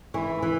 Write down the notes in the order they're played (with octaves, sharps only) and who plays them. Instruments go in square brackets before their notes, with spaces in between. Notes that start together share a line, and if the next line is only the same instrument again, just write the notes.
[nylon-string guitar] E3 [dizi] B5 C#6
[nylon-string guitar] E3